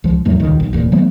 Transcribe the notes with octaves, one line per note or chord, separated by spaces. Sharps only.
C#2 F3
E2 G#2 F#3 A3
D#1 C#2 D#3
B1
F1 E2 A#2
E3 F#3 A3 B3